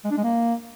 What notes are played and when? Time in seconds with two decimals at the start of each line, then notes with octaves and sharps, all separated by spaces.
0.04 G#3
0.11 D4
0.17 G#3
0.24 A#3